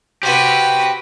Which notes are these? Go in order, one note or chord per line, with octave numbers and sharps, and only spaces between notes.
F#4 G4 B4 C5